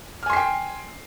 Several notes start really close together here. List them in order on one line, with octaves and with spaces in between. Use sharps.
F6 G#5 C6 C7 G5